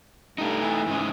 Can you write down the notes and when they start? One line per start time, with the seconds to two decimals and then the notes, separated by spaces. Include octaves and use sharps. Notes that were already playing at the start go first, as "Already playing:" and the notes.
0.38 G2 A3 D#4
0.61 E3
0.87 G#2 C#3 D#4